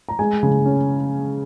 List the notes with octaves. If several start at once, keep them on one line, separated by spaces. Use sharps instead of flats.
A#5
G#3 G#5
C#3
C#4